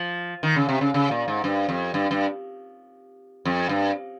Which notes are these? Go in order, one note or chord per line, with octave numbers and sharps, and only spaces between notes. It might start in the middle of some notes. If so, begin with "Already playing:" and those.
Already playing: F3
D#3
C#3
C3
C#3
C#3
A#2
G#2
G2
F2
G2
G2
F2
G2